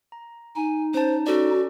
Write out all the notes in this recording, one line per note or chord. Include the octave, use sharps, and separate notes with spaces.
A#5
D#4 G#5
C#4 C5 A5
C#4 F#4 A4 D5